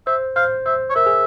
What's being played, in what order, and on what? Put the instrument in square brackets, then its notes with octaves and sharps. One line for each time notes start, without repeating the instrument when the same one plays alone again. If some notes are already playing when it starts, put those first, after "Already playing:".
[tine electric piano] C5 [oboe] E5
[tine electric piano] C5 [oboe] F5
[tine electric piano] C5 [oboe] E5
[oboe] C#5
[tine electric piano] A#4 [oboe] E5
[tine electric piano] G#4